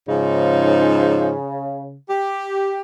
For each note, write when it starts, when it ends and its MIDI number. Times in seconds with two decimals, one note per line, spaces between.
0.08 1.35 44
0.08 1.97 49
0.08 1.35 53
0.08 1.35 63
2.09 2.81 67